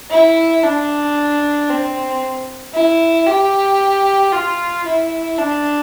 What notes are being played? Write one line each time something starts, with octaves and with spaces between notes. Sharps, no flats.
E4
D4
C4
E4
G4
F4
E4
D4